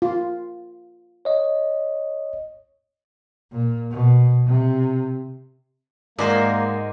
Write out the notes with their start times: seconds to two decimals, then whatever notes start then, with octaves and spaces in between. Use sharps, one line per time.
0.02 F4
1.25 C#5 D#5
3.52 A#2
3.90 B2
4.47 C3
6.18 G#2 G#3 A#3 F#4 A#4 C5 D5 G#5